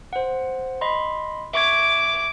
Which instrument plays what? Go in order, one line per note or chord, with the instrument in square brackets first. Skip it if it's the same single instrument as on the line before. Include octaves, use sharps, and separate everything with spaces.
[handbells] C5 F#5
D#5 B5 C6
[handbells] E5 C#6 G#6 [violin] D6